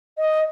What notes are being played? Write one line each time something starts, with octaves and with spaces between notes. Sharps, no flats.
D#5